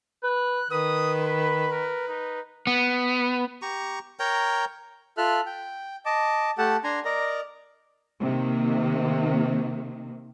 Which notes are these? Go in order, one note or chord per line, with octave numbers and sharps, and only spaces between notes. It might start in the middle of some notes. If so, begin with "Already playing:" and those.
B4 F#6
D#3 B4 D#6
B5
A#4
D#4
B3
G4 A#5 C#6
A#4 C#5 G5 A#5
F4 A4 E5 F6 F#6
G5
D#5 A5 D6
A3 G4 A4 F#5 A5
D4 G#5 A#5 C6
A#4 D5 D#5 A#5
C3 D#3 A#3